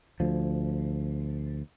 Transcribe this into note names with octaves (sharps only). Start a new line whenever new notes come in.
D2 F3